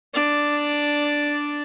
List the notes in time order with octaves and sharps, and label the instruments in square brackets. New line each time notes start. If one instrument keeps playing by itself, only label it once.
[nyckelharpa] D4 D5